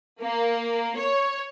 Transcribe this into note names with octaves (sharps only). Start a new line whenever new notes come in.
A#3
C#5